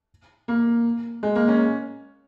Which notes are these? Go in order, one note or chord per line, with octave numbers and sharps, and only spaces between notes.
A#3
G#3
A#3
C#4